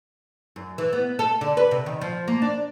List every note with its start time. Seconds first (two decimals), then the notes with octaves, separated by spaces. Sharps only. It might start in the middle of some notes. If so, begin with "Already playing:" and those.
0.56 F#2
0.78 E3
0.93 B3
1.19 A4
1.41 D3
1.57 B4
1.71 C3
1.86 D#3
2.01 F3
2.28 A#3
2.42 D4